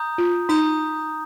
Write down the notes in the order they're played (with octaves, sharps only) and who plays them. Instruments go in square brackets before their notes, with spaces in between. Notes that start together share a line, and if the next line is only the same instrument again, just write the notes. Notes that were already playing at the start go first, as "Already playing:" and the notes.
Already playing: [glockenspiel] A#5 D#6 G6
[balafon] F4
[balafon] D#4 [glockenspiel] A#5 D#6 G6